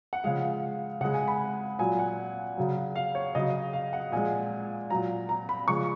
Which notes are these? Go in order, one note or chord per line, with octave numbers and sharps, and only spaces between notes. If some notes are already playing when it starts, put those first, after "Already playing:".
F#5
C#3 F3 G#3 F5
C#3 G#3 F#5
G#5
B5
A#2 F#3 G#5
F#5
C#3 F#3
F5
C#5
C#3 F#3 D#5
F5
F#5
A#2 F3 G#3 G#5
A#2 F#3 A#5
A#5
B5
C#3 F3 G#3 C#6